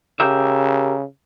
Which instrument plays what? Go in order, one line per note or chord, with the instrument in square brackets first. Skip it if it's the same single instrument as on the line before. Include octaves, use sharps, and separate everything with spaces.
[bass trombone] C#3 [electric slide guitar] G4 A#4 E5